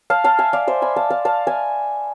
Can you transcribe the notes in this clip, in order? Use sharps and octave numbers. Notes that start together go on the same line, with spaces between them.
F5 A5
F5 A5
E5 G#5
D5 F5
C5 E5
G#5 B5
F5 A5
F5 A5
F5 A5
E5 G#5